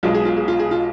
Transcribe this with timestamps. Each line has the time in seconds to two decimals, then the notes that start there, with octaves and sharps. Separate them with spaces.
0.03 B1 B2 G#3 F4
0.14 G#4
0.25 F4
0.37 G#4
0.48 F4
0.59 G#4
0.71 F4